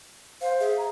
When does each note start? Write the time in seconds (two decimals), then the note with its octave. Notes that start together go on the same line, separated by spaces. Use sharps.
0.41 C5 F5
0.60 G#4 E5
0.78 A#5